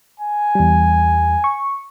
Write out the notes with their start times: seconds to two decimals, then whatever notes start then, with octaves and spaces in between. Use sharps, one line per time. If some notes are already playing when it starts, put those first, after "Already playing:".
0.20 G#5
0.55 E2 G3
1.44 C#6